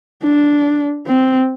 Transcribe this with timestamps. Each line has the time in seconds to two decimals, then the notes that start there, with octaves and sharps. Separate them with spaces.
0.23 D4
1.06 C4